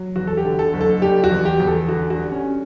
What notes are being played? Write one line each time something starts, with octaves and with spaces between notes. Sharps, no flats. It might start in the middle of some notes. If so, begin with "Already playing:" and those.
Already playing: F#3
E2 F#4
A4
G4
D3
A4
F#1
A4
G3 G4
F#4
E2
G4
E2
A4
D3 F#4
F#4
G3
C#4